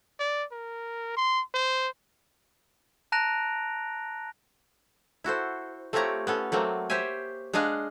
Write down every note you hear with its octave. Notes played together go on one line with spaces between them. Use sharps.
D5
A#4
C6
C5
A5 A#5 F#6 A#6 D7 F7
E4 F#4 A4 C5
A3 C4 F4 G4 C#5 A#5
B3 C#4 A4
F#3 A3 A#3 C4
G4 C5 C#5 E5 G#5
G#3 D4 G#4 D#5 F5 F#5